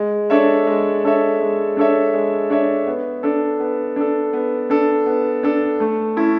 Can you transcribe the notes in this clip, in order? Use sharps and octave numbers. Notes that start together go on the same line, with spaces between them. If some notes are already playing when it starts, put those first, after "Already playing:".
Already playing: G#3
D4 A4 C#5 E5
G#3
D4 A4 C#5 E5
G#3
D4 A4 C#5 E5
G#3
D4 A4 C#5 E5
B3
D4 A4
B3
D4 A4
B3
D4 A4
B3
D4 A4
A3
C#4 E4 A4